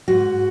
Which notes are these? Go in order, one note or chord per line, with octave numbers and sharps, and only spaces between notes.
G#2 F#4